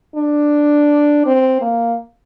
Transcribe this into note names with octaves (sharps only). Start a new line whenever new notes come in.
D4
C4
A#3